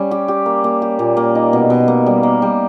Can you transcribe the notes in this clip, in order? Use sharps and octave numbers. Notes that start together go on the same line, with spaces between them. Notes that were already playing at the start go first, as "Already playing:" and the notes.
Already playing: G3 C#4
G4
G4
A#3
A#3
G4
A#2
A#3
D#4
B2
B2
A#3
G3
A#3
G3